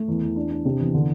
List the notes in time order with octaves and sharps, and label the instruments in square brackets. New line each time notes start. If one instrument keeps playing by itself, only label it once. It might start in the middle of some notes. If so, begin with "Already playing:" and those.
Already playing: [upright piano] A3
E2
E2
D4
D4
C3
E2
D3